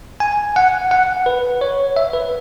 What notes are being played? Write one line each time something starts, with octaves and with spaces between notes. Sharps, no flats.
G#5
F#5
F#5
B4
C#5
E5
B4